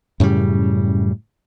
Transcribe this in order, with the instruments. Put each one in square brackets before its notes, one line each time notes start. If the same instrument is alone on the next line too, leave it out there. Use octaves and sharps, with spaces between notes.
[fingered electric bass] F#2 A2 C#3 G3